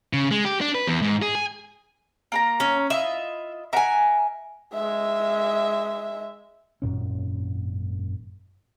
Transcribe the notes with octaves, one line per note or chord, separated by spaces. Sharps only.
C#3
G#3
G4
D4
B4
E2
G#2
G#4
G#5
A#3 A#4 A#5
C#4
E4 F4 D#5 E5
A#4 E5 F#5 G#5
G#3 E5
G#1 F#2 A#2 C#4